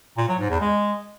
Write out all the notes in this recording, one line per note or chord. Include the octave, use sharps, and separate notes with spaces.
A#2
F#3
G#2
E2
G#3